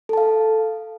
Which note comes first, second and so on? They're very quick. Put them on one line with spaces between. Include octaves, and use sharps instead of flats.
A4 A5 F5